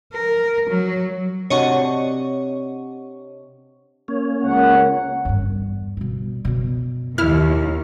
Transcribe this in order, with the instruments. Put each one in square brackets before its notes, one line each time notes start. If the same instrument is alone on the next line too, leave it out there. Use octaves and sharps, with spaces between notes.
[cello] A#4
F#3
[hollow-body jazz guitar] C3 D4 F#4 [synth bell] C#5 D#5 C#6
[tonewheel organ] A#3 C#4 C#5
[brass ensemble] C#2 A#4 F#5
[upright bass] E2 G2
B2 G3
F#2 B2
[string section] D#2 [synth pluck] E4 F6